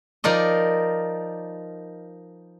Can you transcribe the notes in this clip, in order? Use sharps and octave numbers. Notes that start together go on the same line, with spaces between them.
F3 D#4 A#4 D5 D#5